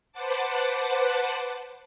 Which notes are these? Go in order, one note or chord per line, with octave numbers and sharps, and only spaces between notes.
B4 C5 F#5 A5 D6